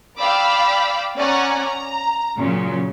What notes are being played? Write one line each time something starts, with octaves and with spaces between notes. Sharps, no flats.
D5 F5 G5 B5 D6 E6
C#4 D5 F#5 G#5 A#5
A#5
A#2 C#3 F#3